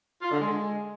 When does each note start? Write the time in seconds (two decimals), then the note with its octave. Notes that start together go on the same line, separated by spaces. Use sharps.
0.22 F4
0.31 D3
0.40 G#3